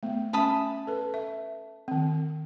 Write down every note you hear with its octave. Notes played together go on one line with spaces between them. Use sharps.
A3 B3
C#4 E5 A5 B5 D#6
A4 B4
E5
D#3 C4